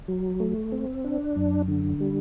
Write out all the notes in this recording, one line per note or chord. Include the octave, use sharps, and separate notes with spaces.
F#3
A3
C4
D4
F#2
D3
G3